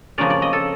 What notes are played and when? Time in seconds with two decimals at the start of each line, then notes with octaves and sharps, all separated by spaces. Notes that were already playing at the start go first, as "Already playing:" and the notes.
0.18 F2 C#3 F3 A#3 C#4 D5
0.30 D5
0.42 D#5
0.53 A4